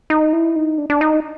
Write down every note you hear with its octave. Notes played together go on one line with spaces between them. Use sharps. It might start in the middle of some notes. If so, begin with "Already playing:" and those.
D#4
E4
D#4
D4
D4
D#4